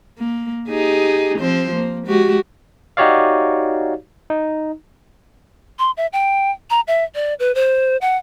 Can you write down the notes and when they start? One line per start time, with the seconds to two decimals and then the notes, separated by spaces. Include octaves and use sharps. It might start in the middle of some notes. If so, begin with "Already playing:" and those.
0.18 A#3
0.70 D#4 G4 G#4
1.38 F3 C4 C5
1.75 A#3
2.07 G#3 F#4 G4
2.97 D#4 F#4 G4 C#5 D5 F5
4.30 D#4
5.79 C6
5.97 E5
6.13 G5
6.70 A#5
6.88 E5
7.15 D5
7.40 B4
7.55 C5
8.01 F#5